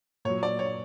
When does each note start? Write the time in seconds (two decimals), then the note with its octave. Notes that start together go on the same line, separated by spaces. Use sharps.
0.25 A#2 F#3 C#5
0.43 D5
0.59 C#5